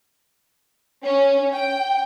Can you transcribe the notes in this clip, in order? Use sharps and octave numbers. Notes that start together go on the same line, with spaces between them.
C#4
G5